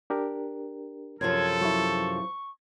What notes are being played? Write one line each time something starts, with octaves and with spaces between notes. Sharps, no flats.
D4 G4 A#4
F#2 C3 F3 A4 G#6
F#3 E4 C#6